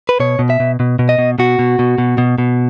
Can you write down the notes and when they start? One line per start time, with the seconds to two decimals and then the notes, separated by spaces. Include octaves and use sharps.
0.09 B4
0.20 B2 C#5
0.39 B2
0.50 E5
0.60 B2
0.80 B2
0.99 B2
1.09 D#5
1.19 B2
1.39 B2 F#4
1.59 B2
1.79 B2
1.98 B2
2.18 B2
2.38 B2